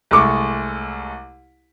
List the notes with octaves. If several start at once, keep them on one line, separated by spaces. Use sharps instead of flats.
C2 G#3 A3 A4 C#6 D6